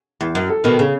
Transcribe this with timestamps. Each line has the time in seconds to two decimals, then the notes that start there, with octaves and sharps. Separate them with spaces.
0.21 E2
0.35 F#2
0.50 A4
0.64 B2 D#3 B3
0.79 C#3 C#4